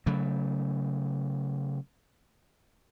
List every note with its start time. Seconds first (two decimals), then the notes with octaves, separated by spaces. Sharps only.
0.06 C#3 F#3 A3